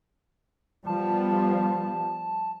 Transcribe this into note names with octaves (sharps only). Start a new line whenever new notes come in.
F3 G3 B3 A5